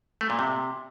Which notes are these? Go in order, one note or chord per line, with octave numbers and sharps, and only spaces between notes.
A3
A#2
C3